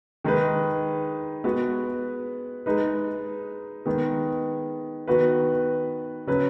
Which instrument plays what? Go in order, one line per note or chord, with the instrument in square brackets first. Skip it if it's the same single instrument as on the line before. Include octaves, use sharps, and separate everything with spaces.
[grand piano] D#3 G#3 D#4 B4
G#3 B3 F#4 B4
G#3 D#4 B4
D#3 G#3 B3
D#3 B3 F#4 B4
C#3 F#3 C#4 B4